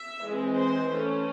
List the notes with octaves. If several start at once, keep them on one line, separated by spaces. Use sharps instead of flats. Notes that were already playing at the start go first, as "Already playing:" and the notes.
Already playing: E5
E3 G#3 C4
C5
E3 A3 C#4